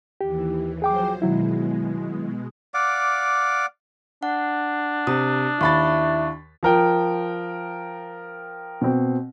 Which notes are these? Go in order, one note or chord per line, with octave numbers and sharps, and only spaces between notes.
D#2 E3 G4
F3 F#3 G#4 C5 G5 D6
B2 D#3 F#3 G#3 E4
D5 F5 F#5 D6
D4 F#5
C3 D#6
D#2 E4 B5 C#6 A6
F3 A#4 G5
B2 C4